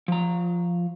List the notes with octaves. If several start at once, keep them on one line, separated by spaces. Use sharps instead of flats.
F3 A#5